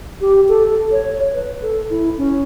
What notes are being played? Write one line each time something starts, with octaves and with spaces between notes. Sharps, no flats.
G4
A4
C#5
B4
A4
E4
C#4